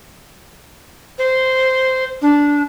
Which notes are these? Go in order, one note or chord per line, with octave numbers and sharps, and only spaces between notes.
C5
D4